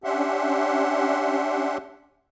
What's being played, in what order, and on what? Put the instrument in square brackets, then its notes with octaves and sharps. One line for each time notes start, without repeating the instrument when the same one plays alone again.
[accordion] C#4 D4 G4 E5 F#5 C6